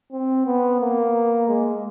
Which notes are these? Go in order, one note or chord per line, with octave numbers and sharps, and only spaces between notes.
C4
B3
A#3
G#3